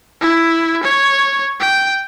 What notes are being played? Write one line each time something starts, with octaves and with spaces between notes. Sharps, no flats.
E4
C#5
G5